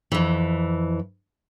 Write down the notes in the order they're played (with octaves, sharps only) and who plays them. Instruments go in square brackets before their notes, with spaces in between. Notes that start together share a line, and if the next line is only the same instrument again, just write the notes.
[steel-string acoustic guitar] F2 E3